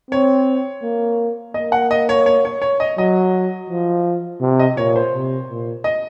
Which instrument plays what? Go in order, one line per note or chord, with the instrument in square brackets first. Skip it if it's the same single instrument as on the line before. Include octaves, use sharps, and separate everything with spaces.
[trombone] C4 [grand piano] C#5
[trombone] A#3
[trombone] A#3 [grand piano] D#5
[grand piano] F#5
D#5
C#5
C#5
C#5
C#5
D#5
[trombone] F#3 [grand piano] D#5
[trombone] F3
C3
[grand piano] D#5
[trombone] A#2 [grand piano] C#5
[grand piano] C5
[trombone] C3
A#2
[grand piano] D#5